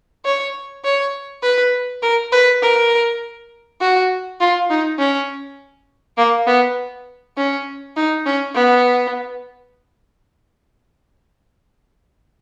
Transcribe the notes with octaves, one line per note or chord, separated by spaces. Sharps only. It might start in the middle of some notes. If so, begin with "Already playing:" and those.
C#5
C#5
B4
A#4
B4
A#4
F#4
F4
D#4
C#4
A#3
B3
C#4
D#4
C#4
B3